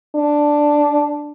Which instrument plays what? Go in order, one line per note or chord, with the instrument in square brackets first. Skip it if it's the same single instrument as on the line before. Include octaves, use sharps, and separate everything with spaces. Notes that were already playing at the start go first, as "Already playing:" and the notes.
[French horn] D4